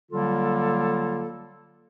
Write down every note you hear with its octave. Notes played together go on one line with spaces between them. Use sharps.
D3 F#3 G3 A#3 F4 A4